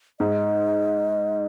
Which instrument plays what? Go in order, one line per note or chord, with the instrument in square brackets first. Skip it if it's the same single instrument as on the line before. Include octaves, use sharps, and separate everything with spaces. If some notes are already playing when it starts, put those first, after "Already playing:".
[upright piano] G#2 [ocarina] D#5